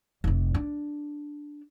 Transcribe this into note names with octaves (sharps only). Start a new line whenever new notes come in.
F1 C3
D4